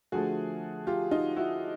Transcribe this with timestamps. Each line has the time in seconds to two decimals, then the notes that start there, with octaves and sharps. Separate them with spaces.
0.12 D3 F3 A3 F#4 G#4
0.87 F4 G4
1.11 D#4 F4
1.36 E4 F#4